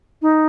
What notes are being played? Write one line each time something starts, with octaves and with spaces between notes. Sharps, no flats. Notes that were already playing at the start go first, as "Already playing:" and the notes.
D#4